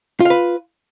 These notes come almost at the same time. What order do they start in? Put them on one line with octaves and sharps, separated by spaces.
F4 F5 B4